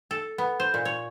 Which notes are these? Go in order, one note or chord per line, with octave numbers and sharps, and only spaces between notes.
A4
B3
C5
A#2
C#5